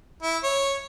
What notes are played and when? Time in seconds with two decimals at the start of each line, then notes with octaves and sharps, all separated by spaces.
0.23 E4
0.43 C#5